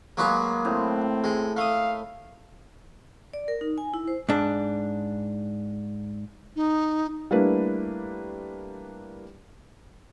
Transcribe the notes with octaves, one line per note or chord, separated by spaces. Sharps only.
F#3 G#3 A#3 F#4 B4
A2 C4
G#3
A3 F5 D#6
D5
A#4
D#4
G#5
E4
C5
G#2 D4
D#4
G3 A3 A#3 D4 E4 B4